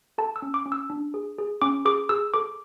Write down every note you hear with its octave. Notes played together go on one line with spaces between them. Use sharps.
A4 A5
E6
C#4
D6
C#4
E6
D4
G#4
G#4
C#4 D6
G#4 D6
G#4 E6
A4 D6